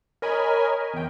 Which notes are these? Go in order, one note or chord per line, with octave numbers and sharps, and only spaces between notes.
A#4 C#5 D#5 G#5 B5
E2 G5